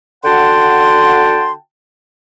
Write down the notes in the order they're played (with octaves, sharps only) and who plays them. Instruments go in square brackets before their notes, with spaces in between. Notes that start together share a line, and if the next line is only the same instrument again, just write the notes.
[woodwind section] D3 F#4 F#5 G5 A5 C6